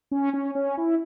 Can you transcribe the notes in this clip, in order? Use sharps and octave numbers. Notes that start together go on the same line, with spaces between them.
C#4
C#4
C#4
E4